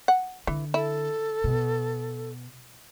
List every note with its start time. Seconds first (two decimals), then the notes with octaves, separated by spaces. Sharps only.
0.08 F#5
0.47 D3 E3
0.74 E4 A4
1.44 B2